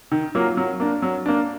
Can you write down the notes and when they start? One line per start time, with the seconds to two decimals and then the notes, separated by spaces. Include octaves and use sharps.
0.11 D#3
0.35 F#3 A#3 F4
0.57 F#3
0.80 A#3 D4
1.02 F#3
1.26 A#3 D4